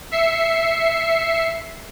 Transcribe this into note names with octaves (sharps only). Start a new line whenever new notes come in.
E5 C7 C#7